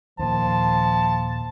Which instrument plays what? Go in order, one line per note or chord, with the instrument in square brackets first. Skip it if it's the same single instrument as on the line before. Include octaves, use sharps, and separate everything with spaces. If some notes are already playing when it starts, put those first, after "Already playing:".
[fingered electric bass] D#2 A#2 [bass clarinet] F3 [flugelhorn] A5